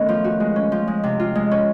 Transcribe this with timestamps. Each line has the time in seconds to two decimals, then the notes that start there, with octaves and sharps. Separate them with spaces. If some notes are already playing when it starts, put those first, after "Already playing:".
Already playing: D#3 A3 B3 C#4
0.09 F3
0.24 F#4
0.40 G#3
0.56 C#4
0.72 F3
0.88 G#3
1.03 C3
1.20 F4
1.35 G#3
1.51 C#4